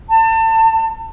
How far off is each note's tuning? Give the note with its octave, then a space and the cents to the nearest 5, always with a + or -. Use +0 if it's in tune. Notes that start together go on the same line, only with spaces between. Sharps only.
A5 +30